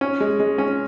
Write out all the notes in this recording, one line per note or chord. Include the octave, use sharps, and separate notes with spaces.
C#4
G#3
G#3
C#4